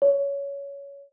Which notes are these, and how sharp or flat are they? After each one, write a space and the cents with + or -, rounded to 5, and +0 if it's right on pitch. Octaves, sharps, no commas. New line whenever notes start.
C#5 +15